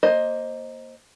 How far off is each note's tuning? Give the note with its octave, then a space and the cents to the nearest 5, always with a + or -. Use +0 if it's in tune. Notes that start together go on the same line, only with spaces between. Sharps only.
A#3 +0 C5 +15 D#5 +0